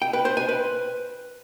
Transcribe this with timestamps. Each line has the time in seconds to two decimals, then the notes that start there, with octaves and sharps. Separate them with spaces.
0.02 G5
0.13 B4
0.25 C5
0.37 G#5
0.49 B4